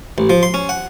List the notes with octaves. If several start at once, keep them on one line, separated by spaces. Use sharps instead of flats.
A1
F3
C6
C#4
F#5